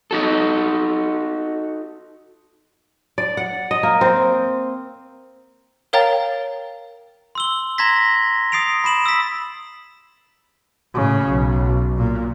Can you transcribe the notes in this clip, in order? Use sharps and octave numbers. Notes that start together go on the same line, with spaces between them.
D#4 F#4 A4
D5
F#5
D#5
A#3
C4
A#4 C#5 F5 G5 A#5 A6
C6 E6 G7
A#5 C6 G#6 A#6 B6
D#6 A6 C7 D7 F7
B5 D#6 E7 F#7
E6 B6
A2 C#3
B1
A#2